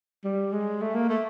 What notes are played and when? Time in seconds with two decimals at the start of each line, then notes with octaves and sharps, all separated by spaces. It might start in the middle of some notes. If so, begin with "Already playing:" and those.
0.24 G3
0.52 G#3
0.82 A3
0.95 A#3
1.09 A3